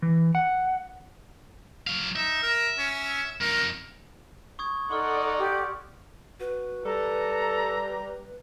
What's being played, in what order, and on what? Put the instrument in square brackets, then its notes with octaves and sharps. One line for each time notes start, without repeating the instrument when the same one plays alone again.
[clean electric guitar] E3
F#5
[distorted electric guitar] F#3 F5
[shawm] D#4 [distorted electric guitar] E5
[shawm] A#4
C#4
[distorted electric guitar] F2 D#4 [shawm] A#4
[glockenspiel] C#6 D#6 G#6
[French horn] D#4 [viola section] A4 D5 F#5 [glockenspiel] C6 C#6 F6
[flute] G4
[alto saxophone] F#4 [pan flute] B4
[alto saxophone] G3 [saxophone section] A4 [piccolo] A#5